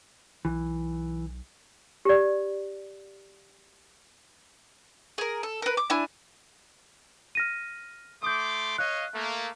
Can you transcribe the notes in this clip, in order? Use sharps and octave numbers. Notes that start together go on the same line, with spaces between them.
B1 E3
G4 D5
G#4 A#4
A4
A#4 B4
D6
D4 E4 G#5
F6 A#6 D#7
A3 C6 D6 D#6 G6
C#5 D#5 F5 F#6
A3 A#3